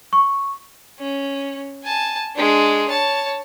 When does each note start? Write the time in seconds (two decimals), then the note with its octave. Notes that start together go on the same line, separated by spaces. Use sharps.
0.13 C#6
0.99 C#4
1.84 G#5 A5
2.35 G#3 D4
2.88 C#5 A5